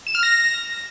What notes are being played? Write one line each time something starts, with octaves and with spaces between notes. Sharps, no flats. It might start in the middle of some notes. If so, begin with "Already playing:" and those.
E7
F6
A#6